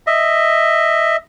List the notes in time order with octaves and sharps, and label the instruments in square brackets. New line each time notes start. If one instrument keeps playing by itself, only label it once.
[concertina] D#5 E5